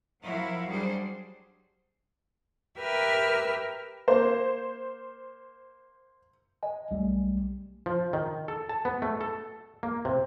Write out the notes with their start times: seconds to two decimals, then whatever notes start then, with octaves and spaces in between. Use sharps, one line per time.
0.23 F3 F#3 E4 F#4 A#4 F5
0.67 F#3 G3 D4 G#4 C5
2.79 G4 A#4 B4 E5 F6
4.08 A#3 C5
6.63 D#5 G#5
6.91 B1 G3 A3
7.86 F3
8.13 D#3
8.48 A4
8.69 A5
8.85 B3
9.02 A3
9.21 A4
9.83 A#3
10.05 C3